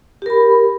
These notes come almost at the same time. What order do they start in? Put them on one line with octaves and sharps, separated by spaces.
G4 A#4 B5